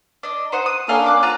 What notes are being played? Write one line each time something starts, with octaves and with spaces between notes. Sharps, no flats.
D4 D#5
D#4 C5 F#5
D#6
A#3 C#4 D4 A4 F5 G5
F5 D6 F#6
F4 C5 F#5 A#5